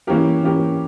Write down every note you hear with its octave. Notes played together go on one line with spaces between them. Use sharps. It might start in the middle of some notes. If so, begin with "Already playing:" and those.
E3 A#3 C#4 G4 A#4
E3 A#3 C#4 G4 A#4